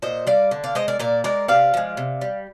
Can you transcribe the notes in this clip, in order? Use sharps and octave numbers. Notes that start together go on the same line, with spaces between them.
A#2 C5 D#5
G3 D5 F5
D3
D5 F5
G#3 C5 D#5
A#4 D5
A#2 A#4 D5
G#3 A#4 D5
C3 D5 F5
F3 G#3
C3
G3